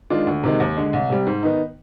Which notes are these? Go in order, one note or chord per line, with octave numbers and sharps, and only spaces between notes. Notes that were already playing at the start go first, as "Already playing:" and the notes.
D#3 G#3 D4 F4
D2
C3 D#3 G#3
D#2
D3 G#3
C2
C3 G3
G#2
D#3 B3 D#4